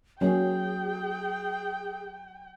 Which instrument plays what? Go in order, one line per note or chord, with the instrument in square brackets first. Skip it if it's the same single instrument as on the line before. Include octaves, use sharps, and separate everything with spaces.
[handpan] F#3 [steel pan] A#3 C#4 [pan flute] G#4 [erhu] G5